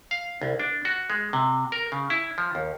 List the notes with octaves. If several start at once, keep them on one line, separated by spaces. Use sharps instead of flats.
F5
C2
D4
F#4
G#3
C3
A#4
C#3
E4
F3
D#2